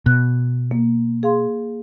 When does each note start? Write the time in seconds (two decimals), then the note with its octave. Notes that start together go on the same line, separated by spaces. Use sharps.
0.06 B2 F#6
0.71 A#3
1.23 G#4 F5 C6